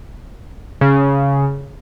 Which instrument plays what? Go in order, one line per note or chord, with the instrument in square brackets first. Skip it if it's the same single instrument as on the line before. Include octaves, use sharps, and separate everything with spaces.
[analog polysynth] C#3